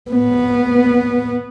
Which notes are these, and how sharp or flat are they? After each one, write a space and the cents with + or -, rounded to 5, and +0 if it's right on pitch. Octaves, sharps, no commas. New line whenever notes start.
B3 -10